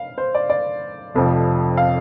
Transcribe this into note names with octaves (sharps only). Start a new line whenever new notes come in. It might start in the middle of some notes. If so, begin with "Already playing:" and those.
Already playing: F5
C5
D5
D5
F1 F2 F3
F5